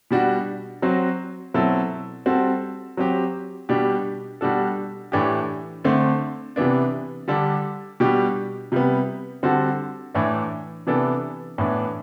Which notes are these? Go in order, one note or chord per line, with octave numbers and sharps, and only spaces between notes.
B2 G3 D4 F#4
F#3 C4 F#4
B2 F#3 C4 E4 A4
G3 C4 F#4 A4
F#3 C4 G4
B2 G3 D4 G4
B2 G3 D4 F#4 A4
A2 E3 A3 D4 G4
D3 A3 C4
C3 E3 B3 D4
D3 G3 D4 A4
B2 G3 D4 G4
C3 G3 B3
D3 G3 C4 F#4 A4
A2 E3 A3 D4
C3 E3 B3 D4 A4
A2 E3 B3 D4